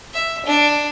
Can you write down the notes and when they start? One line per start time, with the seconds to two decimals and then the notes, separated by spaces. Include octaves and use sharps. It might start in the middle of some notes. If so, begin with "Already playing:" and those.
0.13 E5
0.46 D4